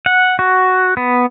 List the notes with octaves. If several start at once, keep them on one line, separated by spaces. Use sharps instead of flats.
F#5
F#4
B3